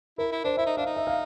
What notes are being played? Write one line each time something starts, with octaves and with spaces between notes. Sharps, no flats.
E4 A#4
E4
D4 C5
E4 E5
D#4
D4 F5
D#4
E5
F5